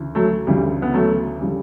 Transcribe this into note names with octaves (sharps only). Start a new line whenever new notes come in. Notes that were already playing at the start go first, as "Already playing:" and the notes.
Already playing: D2 C#3 E3
F#3 A3
D2 C#3 E3 G3
B3
F#3 A3
C#3 E3 G3